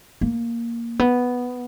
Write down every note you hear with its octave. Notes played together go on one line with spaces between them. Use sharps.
A#3
B3